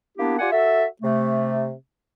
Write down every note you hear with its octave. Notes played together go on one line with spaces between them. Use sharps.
A#3 B3 D4 E4 G4
F4 G4 D5 F#5 G#5
F#4 A4 E5
C3 A3